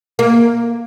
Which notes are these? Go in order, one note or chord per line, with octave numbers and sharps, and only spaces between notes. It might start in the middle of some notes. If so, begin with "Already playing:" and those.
A#3